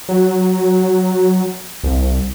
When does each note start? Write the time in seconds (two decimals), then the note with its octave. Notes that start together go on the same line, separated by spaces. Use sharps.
0.09 F#3
1.83 C2